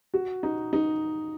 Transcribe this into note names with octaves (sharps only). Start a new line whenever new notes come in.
F#4
D#4
D#4